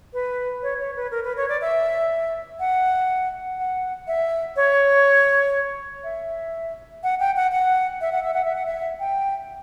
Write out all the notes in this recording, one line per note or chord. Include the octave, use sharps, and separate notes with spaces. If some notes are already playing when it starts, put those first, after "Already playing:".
B4
C#5
C#5
B4
A#4
B4
C#5
D5
E5
F#5
F#5
E5
C#5
E5
F#5
G5
F#5
F#5
E5
F#5
E5
F#5
E5
F#5
E5
G5